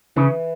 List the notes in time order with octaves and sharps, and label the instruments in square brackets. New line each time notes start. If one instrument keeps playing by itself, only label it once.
[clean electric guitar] C#3 [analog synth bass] E3